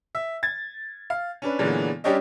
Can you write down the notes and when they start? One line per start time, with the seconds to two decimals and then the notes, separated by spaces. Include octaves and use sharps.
0.15 E5
0.43 G#6 A6
1.10 F5
1.42 C#4 D4 B4
1.59 A#2 D3 E3 F#3 G#3 B3
2.04 G3 C#4 D4 G4 C#5 D#5